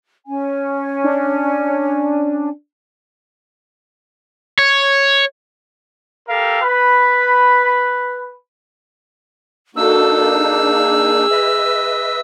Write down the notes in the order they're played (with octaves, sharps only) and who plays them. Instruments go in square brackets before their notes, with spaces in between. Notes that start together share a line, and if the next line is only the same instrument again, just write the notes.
[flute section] C#4 G#5
[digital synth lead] D4
[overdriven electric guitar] C#5
[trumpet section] G4 A4 A#4 F5
B4 B5
[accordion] A#3 D4 D#4 [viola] F#4 A4 [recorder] E6
[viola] G#4
[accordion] B4 D#5 E5